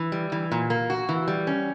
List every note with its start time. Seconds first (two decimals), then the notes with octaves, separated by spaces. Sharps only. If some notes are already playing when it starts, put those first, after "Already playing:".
Already playing: E3
0.12 G3
0.32 E3
0.52 A#2
0.70 A#3
0.90 F#4
1.09 E3
1.28 G3
1.47 C#4